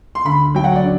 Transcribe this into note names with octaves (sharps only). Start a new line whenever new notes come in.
C6
D2 B5
F#3 G5
F#5
D5
D3